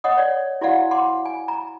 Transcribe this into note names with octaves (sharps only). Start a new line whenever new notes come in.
C#5 D#5 F#5 D#6
C#5 D5
E4 F#4 C5 D5 F5 F#5
F#5 C6 D6
G#5
A#5